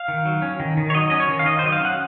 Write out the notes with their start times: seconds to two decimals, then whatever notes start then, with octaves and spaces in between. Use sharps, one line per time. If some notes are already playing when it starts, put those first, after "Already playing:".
Already playing: F5
0.08 D#3
0.26 F#3
0.42 C#4
0.60 D#3
0.77 D#3
0.90 C#5
0.94 F#3 D#5
1.10 C#4 D#5
1.20 C#5
1.29 D#3
1.39 F5
1.46 D#3 D#5
1.59 C5
1.63 F#3 D#5
1.72 F5
1.80 C#4 F#5